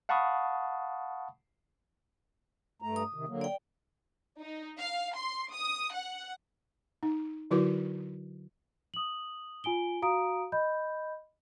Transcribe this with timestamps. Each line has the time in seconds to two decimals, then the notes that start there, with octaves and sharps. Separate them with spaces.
0.09 F5 F#5 A5 B5 C#6 D#6
2.82 G2 A3 A#5
2.96 D#6
3.14 C3 D#3
3.28 D3 F#3 A#3
3.41 D5 G5
4.41 D#4
4.78 F5
5.15 C6
5.52 D#6
5.94 F#5
7.03 D#4
7.51 D3 F#3 E4 F#4 B4 D6
8.94 D#6 F#7
9.64 F4 G#5 D7 G7
10.02 F#4 F5 A#5 D#6 D7
10.52 D#5 B5 G6